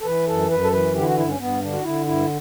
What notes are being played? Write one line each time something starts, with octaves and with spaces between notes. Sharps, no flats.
A4
E3 B4
F#2 A4
F#2 B4
A4
E3 B4
D3 G4
E4
F#4
G2 E4
C#4
G2 B3
D3 D4
F#4
D3 E4
G2 E4